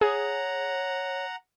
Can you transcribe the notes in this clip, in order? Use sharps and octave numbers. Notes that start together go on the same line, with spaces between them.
G#4 C#5 F#5 A#5